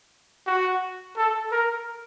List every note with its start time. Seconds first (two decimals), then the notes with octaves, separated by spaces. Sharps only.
0.47 F#4
1.17 A4
1.52 A#4